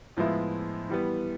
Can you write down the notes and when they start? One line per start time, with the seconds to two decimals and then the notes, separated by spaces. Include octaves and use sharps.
0.17 A2 F3 G#3 B3 E4
0.89 E3 G3 B3